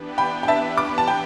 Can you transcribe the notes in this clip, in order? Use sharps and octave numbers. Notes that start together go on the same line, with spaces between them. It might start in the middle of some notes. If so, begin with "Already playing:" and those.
Already playing: E3 B3 D4 G4 B4
G5 B5
G5
E5 A5
D6
B5
A5
G5 B5